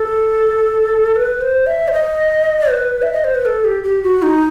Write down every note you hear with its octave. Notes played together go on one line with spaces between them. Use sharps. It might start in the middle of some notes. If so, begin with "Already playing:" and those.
Already playing: A4
B4
C5
E5
C5
D#5
B4
E5
D#5
C5
B4
A4
G4
G4
F#4
D#4